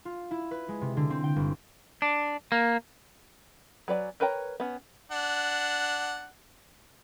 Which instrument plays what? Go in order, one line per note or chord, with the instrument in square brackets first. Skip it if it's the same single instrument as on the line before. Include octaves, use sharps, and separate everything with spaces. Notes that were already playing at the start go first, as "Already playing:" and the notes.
[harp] F4
E4
B4
G#3
C3
D3
C4
G5
G1
[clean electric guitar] D4
A#3
[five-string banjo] F#3 B4 D5 G#5
A#4 B4 C#5 G5 A#5
B3 C#4
[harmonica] D4 F#5